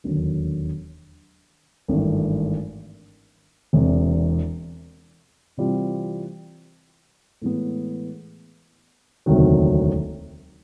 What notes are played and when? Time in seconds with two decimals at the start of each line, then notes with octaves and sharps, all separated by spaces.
0.04 E1 D#2 D3 F#3
1.88 G#1 G2 E3 A3
3.73 E1 E2 C3
5.57 C3 E3 G3 C4 F4
7.42 A2 E3 G#3 B3
9.26 E1 D2 C3 D#3 F#3